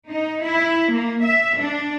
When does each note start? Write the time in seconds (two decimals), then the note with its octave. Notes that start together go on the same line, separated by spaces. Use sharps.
0.10 D#4
0.45 E4
0.94 A#3
1.24 E5
1.61 D4